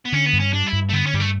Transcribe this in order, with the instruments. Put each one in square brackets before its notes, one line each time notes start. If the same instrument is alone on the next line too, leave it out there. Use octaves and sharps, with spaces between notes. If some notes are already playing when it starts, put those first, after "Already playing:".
[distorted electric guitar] B3
[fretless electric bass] D3 [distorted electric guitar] C#4
[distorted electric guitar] B3
[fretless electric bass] G2
[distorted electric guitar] C#4
[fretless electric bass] G3 [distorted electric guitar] D4
[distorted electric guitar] E4
[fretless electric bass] G2
[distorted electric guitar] A3
[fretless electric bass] D3 [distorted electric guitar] B3
[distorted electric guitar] C#4
[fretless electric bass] G2 [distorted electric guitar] G3
[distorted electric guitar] A3